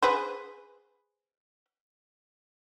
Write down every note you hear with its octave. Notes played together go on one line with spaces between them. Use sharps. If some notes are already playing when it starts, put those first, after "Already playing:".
G#4 B4 C5